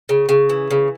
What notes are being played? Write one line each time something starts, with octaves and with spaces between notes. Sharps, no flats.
C#3
C#3
E3
C#3